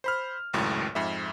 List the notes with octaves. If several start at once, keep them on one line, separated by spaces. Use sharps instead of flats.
C5 B5 F6
G#1 C#2 F#2 A2
F2 G#2 E5